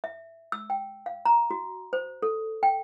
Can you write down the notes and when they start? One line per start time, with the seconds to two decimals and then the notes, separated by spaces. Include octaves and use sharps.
0.04 E5
0.52 E6
0.70 G5
1.06 F5
1.25 A#5
1.51 F#4
1.93 C5
2.22 A4
2.63 G5